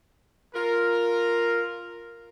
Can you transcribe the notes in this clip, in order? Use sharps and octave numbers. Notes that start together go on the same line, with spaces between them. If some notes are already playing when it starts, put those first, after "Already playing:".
F4 A#4